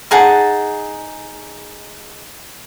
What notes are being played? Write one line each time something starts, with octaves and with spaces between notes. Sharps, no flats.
D#4 G#4 F#5 A5